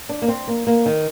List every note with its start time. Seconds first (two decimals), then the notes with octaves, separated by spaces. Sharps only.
0.09 D4
0.22 A#3
0.28 C4
0.48 A#3
0.67 A#3
0.86 D#3